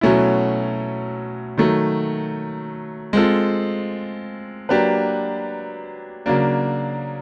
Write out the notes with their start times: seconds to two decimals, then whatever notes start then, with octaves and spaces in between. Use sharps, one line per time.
0.01 B2 F#3 A3 C#4 E4
1.58 D#3 F#3 A3
3.13 G#3 C4 F4 A4
4.69 F#3 A#3 D4 G4 B4
6.26 C#3 F#3 A#3 D4